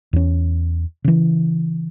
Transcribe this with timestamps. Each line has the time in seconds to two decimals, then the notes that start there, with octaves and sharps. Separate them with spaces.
0.13 E2 C#4
1.04 C#3 E3